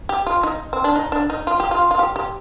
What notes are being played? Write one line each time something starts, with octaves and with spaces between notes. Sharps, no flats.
G4
F4
D#4
C4
D4
D#4
D4
D#4
F4
G4
F4
F4
G4
G4